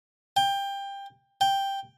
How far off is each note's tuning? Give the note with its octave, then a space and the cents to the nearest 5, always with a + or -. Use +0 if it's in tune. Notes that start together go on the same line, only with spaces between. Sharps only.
G5 +20
G5 +5